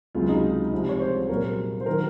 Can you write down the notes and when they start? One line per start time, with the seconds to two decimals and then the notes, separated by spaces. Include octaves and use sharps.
0.15 C#2 C3 F#3 F4
0.28 D#4
0.73 C2 C3 F3
0.89 C#5
1.00 C5
1.29 C2 A#2 F#3 A#4
1.80 C5
1.86 D#3 F#3 A#4